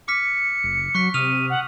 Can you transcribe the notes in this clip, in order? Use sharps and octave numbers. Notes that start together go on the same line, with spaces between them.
D6 F6 B6 C#7
F#1
F#3 C#6 F#6 B6
C3 D#6 F6 D#7 F7
F#5